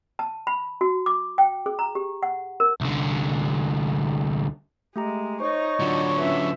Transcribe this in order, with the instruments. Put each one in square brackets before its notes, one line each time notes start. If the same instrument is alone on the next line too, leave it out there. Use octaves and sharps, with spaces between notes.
[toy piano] A5
B5
F#4
D6
G5
G#4
A#5
G4
F#5
A#4
[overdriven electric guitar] C2 D3
[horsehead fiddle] G#3 [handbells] A3 G4 A#5
[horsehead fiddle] D#4 [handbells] C5 [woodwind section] C#5 C#6
[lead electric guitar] D3 F#3 [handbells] F4 D5 F#5
[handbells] C#4 F4 B4 [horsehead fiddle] E5